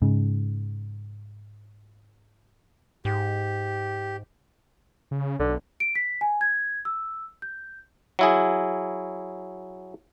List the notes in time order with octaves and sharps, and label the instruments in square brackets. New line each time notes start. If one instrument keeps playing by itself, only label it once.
[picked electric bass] G#2 C#3
[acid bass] G#2 [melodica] G4
[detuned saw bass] C#3
[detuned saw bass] B1 [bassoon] D3
[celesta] D7
B6
G#5
G#6
E6
G6
[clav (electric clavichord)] F#3 E4 G#4